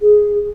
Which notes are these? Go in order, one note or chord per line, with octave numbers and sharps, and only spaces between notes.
G#4